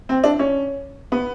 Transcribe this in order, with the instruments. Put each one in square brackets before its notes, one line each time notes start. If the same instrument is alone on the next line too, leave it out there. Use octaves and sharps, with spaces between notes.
[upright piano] C4
D4
C#4
B3